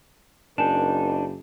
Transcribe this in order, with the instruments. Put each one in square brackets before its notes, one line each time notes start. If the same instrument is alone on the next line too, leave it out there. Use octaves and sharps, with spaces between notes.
[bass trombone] F#1 [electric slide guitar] D4 D#4 [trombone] A#4 [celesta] G#5 A5 E7